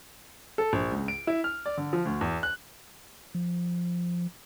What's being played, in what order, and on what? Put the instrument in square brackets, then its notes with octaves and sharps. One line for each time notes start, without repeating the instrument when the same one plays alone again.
[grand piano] A4
A#1
C#2
D7
E4
F6
D5
D3
F3
D2
E2
F#6
[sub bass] F3